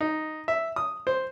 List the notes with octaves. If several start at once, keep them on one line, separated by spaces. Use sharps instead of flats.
D#4
E5
D#6
C5